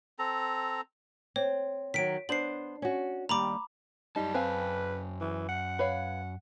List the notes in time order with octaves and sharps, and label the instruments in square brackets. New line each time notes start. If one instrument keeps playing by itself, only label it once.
[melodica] C4 A4 A#5
[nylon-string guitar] C4 [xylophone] C#5
[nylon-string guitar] D#3 F#3 [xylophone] B6 D7
[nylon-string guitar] B3 D4 C5 [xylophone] C7 F#7
[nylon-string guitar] C#4 F#4
[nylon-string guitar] D#2 G3 [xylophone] A#5 B5 D6
[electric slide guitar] F#2 A5 [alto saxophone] G3 [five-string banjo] D#4
[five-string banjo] C4 F5 G#5 [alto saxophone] B4
[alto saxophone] E3
F#5
[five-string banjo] B4 C#5 F5